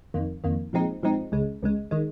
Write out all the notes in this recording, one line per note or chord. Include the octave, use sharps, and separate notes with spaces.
F2 D#3 A#3
F2 D#3 A#3
A#2 F3 G#3 C4 D#4
A#2 F3 G#3 C4 D#4
C#2 C#3 G#3
C#2 C#3 G#3
D#3 G#3